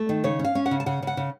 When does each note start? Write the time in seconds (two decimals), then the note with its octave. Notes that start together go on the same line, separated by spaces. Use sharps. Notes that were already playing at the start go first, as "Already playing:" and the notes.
Already playing: A3
0.09 D#3
0.24 C#3 C#5
0.39 C#4
0.44 F5
0.55 C#4
0.66 F#5
0.71 C#3
0.80 A5
0.86 C#3 F#5
1.02 C#3 F#5
1.17 C#3